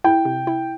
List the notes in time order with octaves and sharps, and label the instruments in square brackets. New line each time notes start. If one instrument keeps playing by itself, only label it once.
[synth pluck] E4 [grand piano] G5
[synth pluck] C3
E4